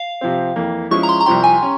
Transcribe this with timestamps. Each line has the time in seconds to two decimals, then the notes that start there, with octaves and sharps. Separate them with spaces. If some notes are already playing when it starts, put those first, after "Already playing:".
Already playing: F5
0.21 C3 F3 C4
0.56 F2 E3 A#3
0.91 F3 G#3 C#4 E4 C#6
1.03 A#5
1.09 C6
1.21 A#5
1.26 C2 C3 F3 C4 G4 C6
1.44 G#5
1.61 C#4 G4